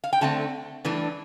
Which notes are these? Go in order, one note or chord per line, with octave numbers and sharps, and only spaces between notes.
F5
G5
D3 A3 C4 A5
G2 E3 A3 D4